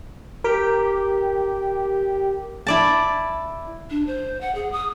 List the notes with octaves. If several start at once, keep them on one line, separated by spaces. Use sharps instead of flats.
G4 A#4
E4 D5 A5
D4
C5
F#5
G#4
D#6